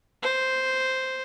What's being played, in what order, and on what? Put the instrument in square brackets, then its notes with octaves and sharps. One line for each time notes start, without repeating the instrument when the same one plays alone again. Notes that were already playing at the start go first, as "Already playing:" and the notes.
[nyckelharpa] C5